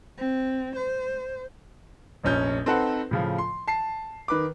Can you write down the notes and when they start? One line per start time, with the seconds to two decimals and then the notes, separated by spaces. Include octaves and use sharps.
0.18 C4
0.76 C5
2.24 F1 A#1 C#4 G6
2.66 C4 D#4 A4 B4 C5 F#5
3.11 A2 C#3 F3
3.38 C6
3.68 A5 C7
4.28 D#3 B4 D6